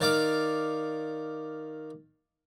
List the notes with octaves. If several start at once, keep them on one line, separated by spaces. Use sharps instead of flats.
D#3 D5 F5 D6